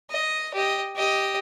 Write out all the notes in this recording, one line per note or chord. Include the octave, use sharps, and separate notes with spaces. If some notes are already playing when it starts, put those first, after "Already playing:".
D#5
G4 D#5
G4 D#5